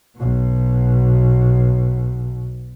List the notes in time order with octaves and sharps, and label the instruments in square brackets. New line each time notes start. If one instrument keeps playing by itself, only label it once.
[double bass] B1 B2